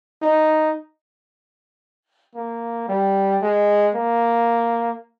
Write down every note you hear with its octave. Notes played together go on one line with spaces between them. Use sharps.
D#4
A#3
G3
G#3
A#3